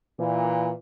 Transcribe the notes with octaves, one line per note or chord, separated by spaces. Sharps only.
A#2 E3